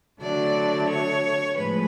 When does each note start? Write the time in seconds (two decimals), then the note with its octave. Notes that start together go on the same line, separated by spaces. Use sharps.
0.21 D3 F#3 A3 D5
0.89 C#5
1.56 A2 F3 G#3 B4